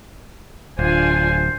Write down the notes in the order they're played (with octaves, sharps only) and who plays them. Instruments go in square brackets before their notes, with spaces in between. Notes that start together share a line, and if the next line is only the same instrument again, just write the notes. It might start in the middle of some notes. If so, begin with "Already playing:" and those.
[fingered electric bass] D1 [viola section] D4 F4 G#5 [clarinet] C5